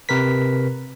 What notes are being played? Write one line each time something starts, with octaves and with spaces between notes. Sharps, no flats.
C3 A#4 B4 B6